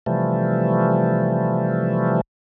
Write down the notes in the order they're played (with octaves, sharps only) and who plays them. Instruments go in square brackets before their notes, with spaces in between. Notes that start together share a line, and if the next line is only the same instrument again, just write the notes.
[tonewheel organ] C3 E3 F3 G3 A3